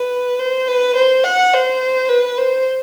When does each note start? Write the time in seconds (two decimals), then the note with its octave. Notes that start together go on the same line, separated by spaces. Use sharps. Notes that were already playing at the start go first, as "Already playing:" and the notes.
Already playing: B4
0.40 C5
0.68 B4
0.96 C5
1.24 F#5
1.53 C5
2.09 B4
2.38 C5